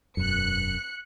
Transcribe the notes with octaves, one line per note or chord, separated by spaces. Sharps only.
E1 F#2 F#6 C#7